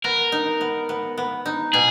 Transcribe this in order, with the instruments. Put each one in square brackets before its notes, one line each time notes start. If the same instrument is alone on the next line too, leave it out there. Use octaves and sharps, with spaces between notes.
[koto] B3 [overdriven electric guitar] A#4
[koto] D#4
B3
B3
B3
D#4
[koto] B2 [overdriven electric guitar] G#4